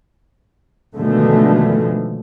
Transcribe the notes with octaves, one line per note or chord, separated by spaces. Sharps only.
B2 D3 D#3 F3 G#3 A3